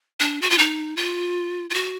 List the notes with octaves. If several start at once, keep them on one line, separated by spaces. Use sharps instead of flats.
D4
F#4
F4
D#4
F4
F4
F#4